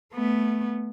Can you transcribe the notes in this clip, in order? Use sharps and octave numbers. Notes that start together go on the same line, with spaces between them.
A3 B3